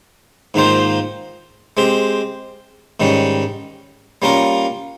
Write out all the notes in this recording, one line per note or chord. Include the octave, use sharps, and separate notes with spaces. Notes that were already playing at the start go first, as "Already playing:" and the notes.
G#2 D#3 A#3 F4 C5
G#3 C4 G4
G#2 D#3 G3 C#4
G3 A#3 C#4 F4 A#4